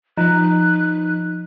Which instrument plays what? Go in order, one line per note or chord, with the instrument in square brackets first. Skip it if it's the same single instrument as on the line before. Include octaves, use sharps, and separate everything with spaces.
[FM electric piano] F3 [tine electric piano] D#4 [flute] F#6